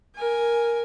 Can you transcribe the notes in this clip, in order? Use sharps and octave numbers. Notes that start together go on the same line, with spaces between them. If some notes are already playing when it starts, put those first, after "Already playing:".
A#4 G#5